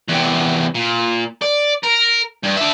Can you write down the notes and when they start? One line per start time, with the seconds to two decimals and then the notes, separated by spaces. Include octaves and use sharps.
0.09 E2 C3
0.75 A#2
1.42 D5
1.83 A#4
2.43 G2
2.56 D4 E5